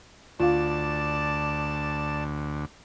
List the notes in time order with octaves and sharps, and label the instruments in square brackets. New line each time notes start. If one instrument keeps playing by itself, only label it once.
[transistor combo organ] D2 [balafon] F4 F5 [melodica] D5 A5